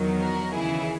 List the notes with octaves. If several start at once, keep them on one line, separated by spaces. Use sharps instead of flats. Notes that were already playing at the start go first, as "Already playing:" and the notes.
Already playing: E2 D#3 F#3
F#4 A#4
D#2 C#3 E3 E4 G#4